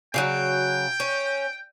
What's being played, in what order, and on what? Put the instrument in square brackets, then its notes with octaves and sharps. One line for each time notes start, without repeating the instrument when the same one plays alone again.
[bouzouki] C#3 F3 F#3 [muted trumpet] G5
[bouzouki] C#4